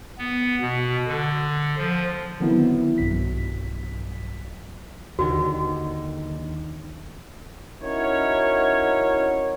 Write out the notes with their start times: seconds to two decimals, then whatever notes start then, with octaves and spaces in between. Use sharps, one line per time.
0.18 B3
0.61 B2
1.08 D3
1.78 F3
2.40 D3 D#3 F#3 B3 C4 E4
2.98 B1 G2 F#3 B6
5.19 D#2 D3 D#3 F#4
7.82 C#4 D#4 E4 F#4 A#4 C#5